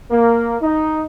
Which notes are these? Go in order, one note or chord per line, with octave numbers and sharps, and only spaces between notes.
A#3
D#4